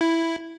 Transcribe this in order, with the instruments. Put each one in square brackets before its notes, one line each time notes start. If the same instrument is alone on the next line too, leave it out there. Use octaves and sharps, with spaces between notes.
[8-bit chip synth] E4